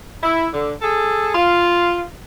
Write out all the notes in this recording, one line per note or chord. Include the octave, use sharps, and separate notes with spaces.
E4
D3
G#4 A4
F4